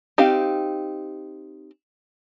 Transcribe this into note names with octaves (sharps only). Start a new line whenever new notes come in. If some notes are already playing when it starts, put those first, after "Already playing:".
C4 D#4 G4 F5